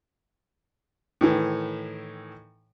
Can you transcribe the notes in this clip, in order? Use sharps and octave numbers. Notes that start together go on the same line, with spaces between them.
A2 D#3 E3